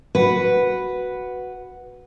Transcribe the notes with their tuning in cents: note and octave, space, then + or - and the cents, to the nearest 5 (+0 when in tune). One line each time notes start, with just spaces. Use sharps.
F#4 +0 B4 +0 F#5 +0